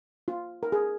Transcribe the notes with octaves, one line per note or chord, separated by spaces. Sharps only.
F4
A#4
G#4